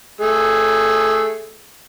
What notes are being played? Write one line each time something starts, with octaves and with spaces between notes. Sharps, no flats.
A3 G#4